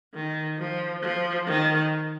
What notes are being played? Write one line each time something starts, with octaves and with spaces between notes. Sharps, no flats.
D#3
F3
F3
D#3